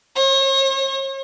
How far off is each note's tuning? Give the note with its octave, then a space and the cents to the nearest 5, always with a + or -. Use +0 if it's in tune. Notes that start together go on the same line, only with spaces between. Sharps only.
C#5 -45